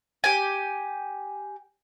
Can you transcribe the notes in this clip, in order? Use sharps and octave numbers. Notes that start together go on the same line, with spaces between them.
G4 G#5